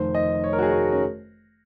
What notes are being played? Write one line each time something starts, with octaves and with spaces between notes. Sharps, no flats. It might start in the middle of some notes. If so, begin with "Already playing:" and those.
Already playing: F1 F2 D#3 C5
D#5
C#5
A#4
F#4
G#4
F#4
C#4